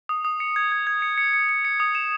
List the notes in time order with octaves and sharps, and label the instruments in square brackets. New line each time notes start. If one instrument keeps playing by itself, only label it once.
[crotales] D#6
D#6
C#7
G#6
G#6
G#6
C#7
C#7
C#7
C#7
C#7
D#6
E7